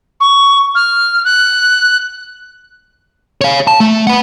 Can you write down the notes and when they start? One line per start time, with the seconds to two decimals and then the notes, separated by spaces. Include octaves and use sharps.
0.20 C#6
0.75 F6
1.25 F#6
3.41 C#5 F5
3.67 A5
3.80 A3
4.07 B4 F#5